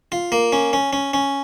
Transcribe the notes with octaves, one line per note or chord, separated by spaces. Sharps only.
F4
A#3
C#4
C#4
C#4
C#4